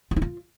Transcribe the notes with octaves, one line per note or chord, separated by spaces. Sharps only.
F4
E4
F4